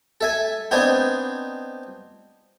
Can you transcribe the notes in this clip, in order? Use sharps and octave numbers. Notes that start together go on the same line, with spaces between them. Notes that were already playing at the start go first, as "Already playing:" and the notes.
A4 E5 G#5
B3 C4 D4 D#4 G#5